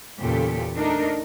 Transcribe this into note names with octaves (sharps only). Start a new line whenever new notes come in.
E2 A#2 C#3 G4 A4
A3 D4 D#4 A#4